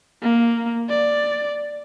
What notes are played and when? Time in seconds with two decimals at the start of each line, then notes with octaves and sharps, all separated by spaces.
0.23 A#3
0.90 D5